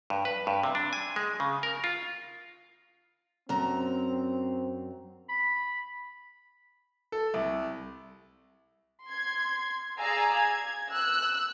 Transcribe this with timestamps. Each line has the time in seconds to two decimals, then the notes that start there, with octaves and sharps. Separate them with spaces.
0.10 G2
0.25 B4
0.47 G2
0.63 C3
0.75 D4
0.93 G#5
1.16 G#3
1.40 C#3
1.63 A#4
1.84 F4
3.49 F#2 C4 A#5
5.29 B5
7.12 A4
7.34 C2
9.04 C6 G#6
10.00 G#4 D5 F5 G#5 A#5 E6
10.35 G#6
10.90 E6 F#6